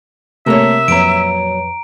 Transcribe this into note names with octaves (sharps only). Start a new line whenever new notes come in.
C3 A3 A#3 A#4 C#5 E5 A#5
F2 A#2 F#3 B4 C#5 A#5 D7